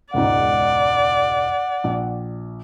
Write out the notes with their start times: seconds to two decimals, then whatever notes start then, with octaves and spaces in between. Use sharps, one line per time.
0.14 E1 C#2 G#2 D5 F#5
1.84 A#1